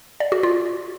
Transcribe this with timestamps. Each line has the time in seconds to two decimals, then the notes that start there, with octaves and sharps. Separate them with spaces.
0.20 D5
0.32 F#4
0.43 F4